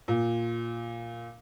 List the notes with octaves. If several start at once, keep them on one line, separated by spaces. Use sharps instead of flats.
A#2